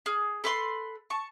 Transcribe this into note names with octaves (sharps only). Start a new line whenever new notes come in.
G#4 F6
A4 B4 B5 C6
A5 C#6